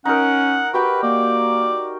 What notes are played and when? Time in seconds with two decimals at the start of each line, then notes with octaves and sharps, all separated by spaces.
0.05 C#4 D#4 A#4 F#5
0.73 F#4 G4 B4 G5
1.03 A#3 D5